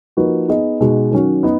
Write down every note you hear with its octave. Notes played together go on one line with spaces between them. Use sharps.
F3 A#3 D#4 F#4 B4
B3 D#4 G#4 D#5
B2 G#3 D#4 F#4
D#3 F#3 C#4 F#4
B3 D#4